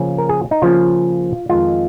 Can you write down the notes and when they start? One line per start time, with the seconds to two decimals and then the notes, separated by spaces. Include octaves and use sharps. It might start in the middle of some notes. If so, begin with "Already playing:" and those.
Already playing: C#3 F3 A#3 C#4
0.18 A#4
0.29 G#4
0.51 D#4
0.62 C#3 F3 A#3 C#4 F4
1.49 F2 D#3 G#3 F4